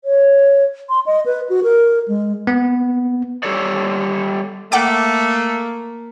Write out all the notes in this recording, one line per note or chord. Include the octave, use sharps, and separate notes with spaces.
C#5
C6
D#5
B4
F#4
A#4
G#3
B3
G3 G4 A4 C#5 D5
A3 A#3 F#5 G5 D6